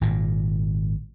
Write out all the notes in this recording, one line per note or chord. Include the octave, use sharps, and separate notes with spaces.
G#1 A#2